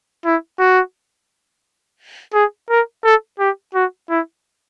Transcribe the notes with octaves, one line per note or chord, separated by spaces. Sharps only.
E4
F#4
G#4
A#4
A4
G4
F#4
E4